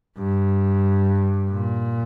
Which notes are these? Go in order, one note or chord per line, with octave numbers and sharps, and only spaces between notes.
G2
A#2